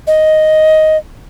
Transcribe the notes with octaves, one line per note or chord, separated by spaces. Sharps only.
D#5